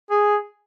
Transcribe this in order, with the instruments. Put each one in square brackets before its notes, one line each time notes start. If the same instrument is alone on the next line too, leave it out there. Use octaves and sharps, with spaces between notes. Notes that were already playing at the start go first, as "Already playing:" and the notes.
[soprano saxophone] G#4